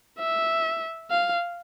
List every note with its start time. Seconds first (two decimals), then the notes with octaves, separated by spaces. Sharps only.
0.19 E5
1.11 F5